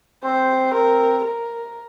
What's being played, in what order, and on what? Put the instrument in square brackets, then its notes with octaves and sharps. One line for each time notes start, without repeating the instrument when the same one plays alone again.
[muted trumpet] C4 [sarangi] C5
[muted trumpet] C4 [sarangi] A#4
[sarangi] A#4